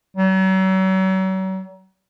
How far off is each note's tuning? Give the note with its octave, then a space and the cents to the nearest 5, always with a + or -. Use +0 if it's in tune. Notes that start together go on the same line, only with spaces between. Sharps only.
F#3 +40